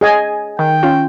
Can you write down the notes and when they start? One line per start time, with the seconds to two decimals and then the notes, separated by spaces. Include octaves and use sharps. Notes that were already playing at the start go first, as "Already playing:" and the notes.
0.01 G#4 D#5 G#5
0.59 D#3 G5
0.83 C#4 F4